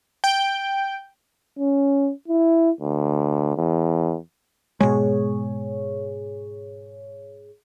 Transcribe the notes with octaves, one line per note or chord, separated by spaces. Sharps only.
G5
C#4
E4
D2
E2
G#2 B2 G#3 G#4 C#5